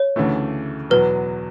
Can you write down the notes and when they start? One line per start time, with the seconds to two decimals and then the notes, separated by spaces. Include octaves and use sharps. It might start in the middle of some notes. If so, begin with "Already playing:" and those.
Already playing: C#5
0.16 D2 C#3 E3 A3
0.90 E2 B2 F#3 B4